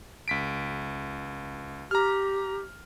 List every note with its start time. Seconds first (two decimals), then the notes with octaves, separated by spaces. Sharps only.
0.28 C#2 B6 D7
1.91 G4 A#5 F6